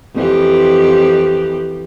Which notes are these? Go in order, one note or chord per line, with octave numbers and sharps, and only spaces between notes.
F2 E3 G4